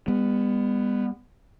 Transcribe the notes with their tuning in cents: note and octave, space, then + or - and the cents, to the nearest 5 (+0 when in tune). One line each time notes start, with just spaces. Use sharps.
G3 +45 B3 +0